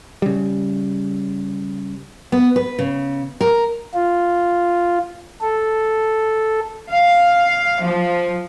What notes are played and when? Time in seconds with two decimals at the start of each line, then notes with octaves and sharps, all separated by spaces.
0.22 C#3 G3
2.32 B3
2.56 B4
2.79 C#3
3.41 A#4
3.94 F4
5.41 A4
6.89 F5
7.82 F3